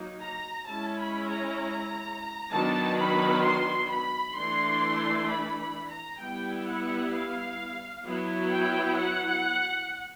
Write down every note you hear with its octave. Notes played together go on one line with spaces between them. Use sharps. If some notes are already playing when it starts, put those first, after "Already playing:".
Already playing: F#3 A#3 D#4
A#5
G#3 C#4 E4 A5
B5
A#5
D#3 F#3 B3 D4 A5
B5
C6
B5
E3 A3 D4 C6
B5
B5
A#5
G3 B3 E4 G5
F#5
F5
F#3 B3 E4
G5
F#5